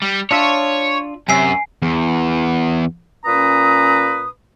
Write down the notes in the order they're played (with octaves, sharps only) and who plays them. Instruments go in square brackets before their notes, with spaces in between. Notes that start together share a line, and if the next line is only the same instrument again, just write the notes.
[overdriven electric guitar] G3
[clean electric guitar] D4 F4 E5 [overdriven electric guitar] C#5
[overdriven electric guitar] F#2 [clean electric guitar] C3 E5 [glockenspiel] G#5 C7
[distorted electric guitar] E2
[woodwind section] A#2 C#4 B4 A#5 D#6